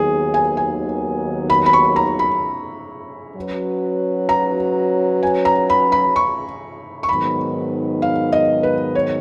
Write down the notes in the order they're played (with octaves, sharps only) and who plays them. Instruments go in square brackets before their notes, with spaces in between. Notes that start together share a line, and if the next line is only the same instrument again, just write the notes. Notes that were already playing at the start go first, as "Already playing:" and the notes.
Already playing: [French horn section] D#2 D#3 F#3 B3 [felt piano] G#4
[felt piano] G#5
G#5
B5
B5
C#6
A#5
B5
[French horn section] F#3 C#4 F#4 B4
[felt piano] A#5
G#5
A#5
B5
B5
C#6
C#6
[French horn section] G#2 D#3 F#3 B3 [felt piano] B5
[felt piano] F5
D#5
B4
C#5